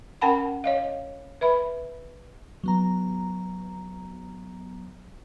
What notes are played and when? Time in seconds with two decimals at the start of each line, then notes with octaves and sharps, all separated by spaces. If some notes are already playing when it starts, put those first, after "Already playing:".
0.21 C#4 A#4 F#5 G5 A5 B5
0.64 C#5 D#5 F5
1.41 B4 E5 B5
2.64 F#3 B3 A#5